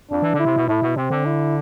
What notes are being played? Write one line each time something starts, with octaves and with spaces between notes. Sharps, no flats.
F2 D4
E3
D3
E4
C3
B2
A2 E4
B2
C3 C4
D3
E4